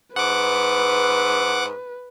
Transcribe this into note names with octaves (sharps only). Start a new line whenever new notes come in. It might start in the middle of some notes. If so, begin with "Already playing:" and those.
G#2 B4 F#5 D6